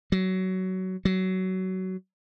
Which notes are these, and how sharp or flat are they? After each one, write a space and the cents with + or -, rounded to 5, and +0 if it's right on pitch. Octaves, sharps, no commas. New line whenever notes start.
F#3 +20
F#3 +20